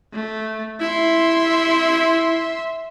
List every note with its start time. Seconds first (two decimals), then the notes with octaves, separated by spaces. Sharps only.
0.13 A3
0.81 E4 E5 C6